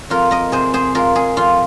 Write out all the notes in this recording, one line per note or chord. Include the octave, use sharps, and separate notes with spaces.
F2 F4 A#4
A#4 D#5
C3 G#4 C5
G#4 C5
G#3 F4 A#4
G#4
F2 F4